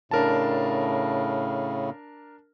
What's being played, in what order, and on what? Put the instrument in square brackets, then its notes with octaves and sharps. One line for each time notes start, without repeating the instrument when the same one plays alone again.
[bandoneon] A2 C#3 [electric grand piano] D4 A#4 A5